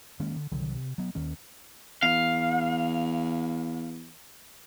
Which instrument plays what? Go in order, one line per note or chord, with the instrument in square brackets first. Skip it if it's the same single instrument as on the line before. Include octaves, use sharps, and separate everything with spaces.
[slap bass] D#3 G#3 A#3 C#4
D3
C2 D3 D#3 F#3
C3
F#3 B3
D#2 D#3 C#4
[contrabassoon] E2 [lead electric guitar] F5